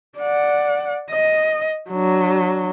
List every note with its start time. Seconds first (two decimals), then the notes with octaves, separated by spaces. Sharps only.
0.18 D5 F#5
1.11 D#5
1.90 F#3 D4